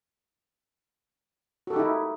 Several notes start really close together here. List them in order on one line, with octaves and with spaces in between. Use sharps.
F#4 A4 G4 D#4 E4